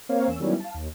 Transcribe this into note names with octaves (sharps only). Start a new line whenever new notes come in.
A#3 C4 A#4 C5 C#5 F5
E2 C#4 E6
D#3 F#3 G3 B3 C#4 E4
F5 A5
D#2